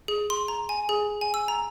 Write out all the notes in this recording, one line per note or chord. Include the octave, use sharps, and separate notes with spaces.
G#4
C6
A#5
G#5
G#4
G#5
E6
A#5